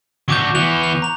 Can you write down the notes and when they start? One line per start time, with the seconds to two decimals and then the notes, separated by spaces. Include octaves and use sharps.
0.28 F#3 D4 C#6 D6 G6
0.55 E3 B3 F#6 F7
0.83 F7
1.02 A#5 F7